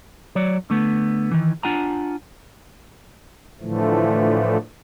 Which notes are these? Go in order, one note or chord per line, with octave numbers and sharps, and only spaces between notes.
F#3 C#5 D5
D3 A3 B3
D#3 E3
D4 F4 F#5 G#5 A#5
A2 D3 E3 F3 A3